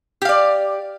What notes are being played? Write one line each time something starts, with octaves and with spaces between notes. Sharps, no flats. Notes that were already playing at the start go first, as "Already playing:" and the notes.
G4 D5 F5